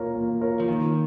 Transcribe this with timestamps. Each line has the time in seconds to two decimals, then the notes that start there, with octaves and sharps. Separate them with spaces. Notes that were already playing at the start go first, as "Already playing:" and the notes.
Already playing: A#3 F4 A#4 C#5
0.15 A#3
0.41 F4 A#4 C#5
0.60 F3
0.68 D#3 A#3